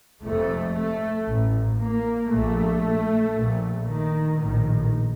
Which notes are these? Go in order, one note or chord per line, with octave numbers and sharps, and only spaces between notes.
F1 F2 C3 A3
A3
A1 A2
A#3
A#1 A#2 A3
A#1 A#2
D#3
A#1 A2 D#3